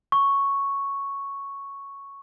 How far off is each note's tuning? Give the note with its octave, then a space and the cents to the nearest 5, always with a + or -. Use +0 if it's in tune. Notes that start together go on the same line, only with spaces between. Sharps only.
C#6 +0